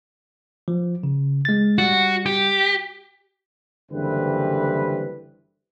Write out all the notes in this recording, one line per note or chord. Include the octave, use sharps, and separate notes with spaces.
F3
C#3
G#3 A6
G3 F#4
G4
F#1 D3 E3 G3 C4 B4